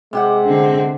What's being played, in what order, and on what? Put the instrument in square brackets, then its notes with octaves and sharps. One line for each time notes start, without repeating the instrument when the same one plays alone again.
[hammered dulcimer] C3 G4 F#5 [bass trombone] G#3
[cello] D3 C4